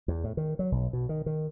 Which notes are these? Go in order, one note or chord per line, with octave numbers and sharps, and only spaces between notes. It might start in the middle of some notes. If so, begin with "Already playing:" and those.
E2
A2
D#3
F#3
B1
B2
D#3
D#3